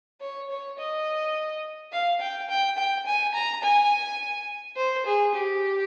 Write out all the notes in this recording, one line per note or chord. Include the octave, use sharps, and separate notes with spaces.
C#5
C#5
D#5
F5
G5
G5
G5
G#5
A#5
G#5
C5
G#4
G4